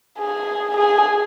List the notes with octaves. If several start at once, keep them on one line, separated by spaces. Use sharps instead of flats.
G#4
G#4